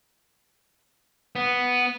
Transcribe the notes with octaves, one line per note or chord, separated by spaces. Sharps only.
B3